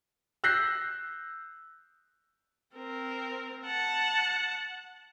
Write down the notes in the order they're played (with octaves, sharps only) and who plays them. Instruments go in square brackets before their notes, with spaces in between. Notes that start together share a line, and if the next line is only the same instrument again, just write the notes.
[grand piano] E6 F#6 G6 A#6 C7
[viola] C4 A#4
F#5 A5